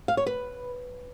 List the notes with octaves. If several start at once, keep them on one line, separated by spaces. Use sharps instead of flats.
F5
C#5
B4